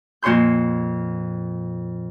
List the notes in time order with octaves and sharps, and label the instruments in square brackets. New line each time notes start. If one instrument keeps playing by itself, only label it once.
[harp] F2 A#2 C#5 C6 G6